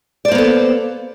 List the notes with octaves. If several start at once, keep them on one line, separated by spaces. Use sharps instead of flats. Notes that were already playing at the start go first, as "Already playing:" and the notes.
A#3 B3 A4 C5 D5